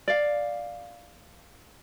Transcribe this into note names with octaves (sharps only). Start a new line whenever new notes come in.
D5 F5